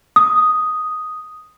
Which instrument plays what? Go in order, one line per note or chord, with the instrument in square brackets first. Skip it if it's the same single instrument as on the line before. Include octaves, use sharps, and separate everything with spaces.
[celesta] D#6